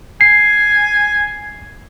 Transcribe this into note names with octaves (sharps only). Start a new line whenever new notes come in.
G#5 C7